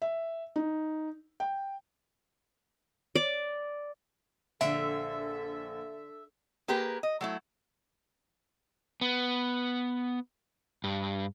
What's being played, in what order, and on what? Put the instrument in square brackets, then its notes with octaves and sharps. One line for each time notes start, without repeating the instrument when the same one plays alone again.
[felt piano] E5
D#4
G5
[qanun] D5
[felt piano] A#1 [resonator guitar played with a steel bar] D3 [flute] A4 [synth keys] E5
[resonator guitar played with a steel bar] A#3 G4 G#4 A#4 B4
D#5
F#3 A3 E4
[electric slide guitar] B3
G2